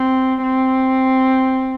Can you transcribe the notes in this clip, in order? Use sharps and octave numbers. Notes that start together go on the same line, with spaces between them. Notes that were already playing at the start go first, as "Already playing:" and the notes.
Already playing: C4
C4